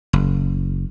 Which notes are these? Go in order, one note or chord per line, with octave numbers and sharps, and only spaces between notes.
F#1